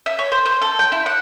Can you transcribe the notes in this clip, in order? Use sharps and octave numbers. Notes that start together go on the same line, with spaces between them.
E5
C#5
C5
C5
A4
G5
E4
F#5